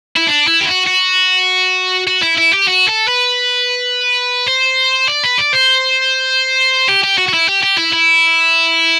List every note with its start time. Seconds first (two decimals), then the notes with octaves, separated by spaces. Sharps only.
0.16 E4
0.27 D4
0.47 E4
0.61 G4
0.67 F#4
0.87 F#4
2.07 F#4
2.22 E4
2.38 E4
2.53 G4
2.67 F#4
2.88 A4
3.08 B4
4.48 C5
5.08 D5
5.24 B4
5.38 D5
5.53 C5
6.88 G4
7.04 G4
7.18 F#4
7.29 F#4
7.34 E4
7.49 G4
7.64 G4
7.78 E4
7.93 E4